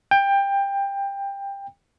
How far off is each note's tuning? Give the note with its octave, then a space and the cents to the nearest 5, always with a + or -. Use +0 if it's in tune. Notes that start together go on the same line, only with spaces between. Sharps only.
G5 +20